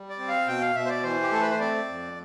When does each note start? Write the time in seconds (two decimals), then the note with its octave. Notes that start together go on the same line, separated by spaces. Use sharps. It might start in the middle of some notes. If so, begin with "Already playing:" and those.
Already playing: G3
0.10 D5
0.18 C4
0.28 F5
0.47 B2 G5
0.61 F5
0.75 B2 E5
0.86 C5
0.89 D5
1.03 E3 C5
1.22 G4
1.32 A3 A4
1.41 B4
1.51 C5
1.60 C4 D5
1.88 F2